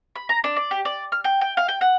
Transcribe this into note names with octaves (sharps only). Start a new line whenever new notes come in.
B5
A#5
D4
D5
G4
D5
F6
G5
G5
F5
G5
F#5